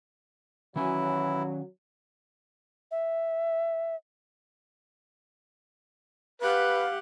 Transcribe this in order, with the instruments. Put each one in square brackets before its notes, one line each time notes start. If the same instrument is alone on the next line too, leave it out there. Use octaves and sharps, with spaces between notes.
[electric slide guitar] D#3 C#4 G#5 [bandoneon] E3 E4 [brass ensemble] F#3
[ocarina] E5
[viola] G4 F#5 [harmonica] B4 [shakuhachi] F5